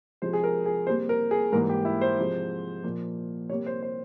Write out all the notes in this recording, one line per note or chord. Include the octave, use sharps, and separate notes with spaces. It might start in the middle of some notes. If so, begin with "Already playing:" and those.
C3 F3 G#3 C5
G#4
A#4
G#4
C3 G3 A#3 C5
A#4
G#4
G#2 E3 G3 A#3 A#4
G4
E4
C5
C3 F3 G#3
A#2 F3 A#3
C3 G3 A#3 C#5
C5
C5